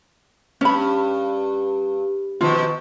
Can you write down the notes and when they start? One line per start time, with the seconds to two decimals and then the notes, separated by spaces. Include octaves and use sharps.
0.61 G2 C#4 B5
2.41 B2 D#3 F3 F4